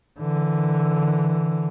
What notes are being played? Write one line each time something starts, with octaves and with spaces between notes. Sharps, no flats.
D3 E3